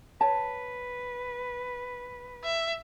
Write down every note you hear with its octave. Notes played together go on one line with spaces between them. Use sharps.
B4 C#5 A5
E5